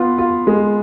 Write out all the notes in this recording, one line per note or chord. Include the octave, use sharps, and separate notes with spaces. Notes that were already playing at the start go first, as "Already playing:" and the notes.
Already playing: B3 F4
F4
G#3